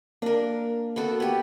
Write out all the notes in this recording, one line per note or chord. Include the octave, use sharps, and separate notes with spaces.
A#3 D4 A#4
B3 F#4 A4
B3 G4